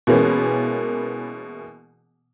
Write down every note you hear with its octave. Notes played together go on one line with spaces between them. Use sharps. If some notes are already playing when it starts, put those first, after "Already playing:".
B2 E3 G#3 A#3 B3 C#4